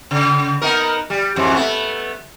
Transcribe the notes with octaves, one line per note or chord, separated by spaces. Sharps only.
C#3
B3 D#4 A#4
G3
F2 G#2 E3
A3 B3